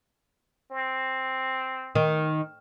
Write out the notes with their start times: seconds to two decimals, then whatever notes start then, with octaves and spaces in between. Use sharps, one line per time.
0.71 C4
1.95 D#3